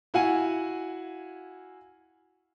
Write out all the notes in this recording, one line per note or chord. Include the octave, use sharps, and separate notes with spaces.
E4 F#4 F5 F#5 G#5